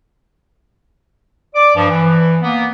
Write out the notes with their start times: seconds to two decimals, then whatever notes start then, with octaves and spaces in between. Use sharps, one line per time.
1.55 D5 D6
1.76 G2 F3
1.90 E3
2.41 A#3 B3